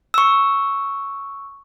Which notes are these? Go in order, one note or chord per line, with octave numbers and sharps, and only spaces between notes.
C#6 E6